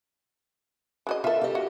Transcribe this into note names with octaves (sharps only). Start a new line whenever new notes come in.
G#3 F#4 D#5
F4 A4 A#4 E5
G4 D#5
F#4